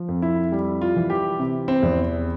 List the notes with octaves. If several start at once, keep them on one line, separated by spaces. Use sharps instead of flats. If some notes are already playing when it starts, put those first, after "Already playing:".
Already playing: F3
F2
E4
G3
F4
E3
G4
C3
C4
E2